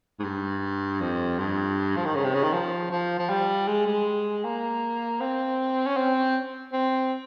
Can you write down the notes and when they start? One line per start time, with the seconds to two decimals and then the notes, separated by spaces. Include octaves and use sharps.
0.19 G#2
0.24 G2
1.01 F2
1.39 G2
1.96 F3
2.05 D#3
2.15 C#3
2.24 C3
2.34 C#3
2.43 D#3
2.53 F3
2.91 F3
3.19 F3
3.29 G3
3.67 G#3
3.87 G#3
4.44 A#3
5.21 C4
5.87 C#4
5.96 C4
6.73 C4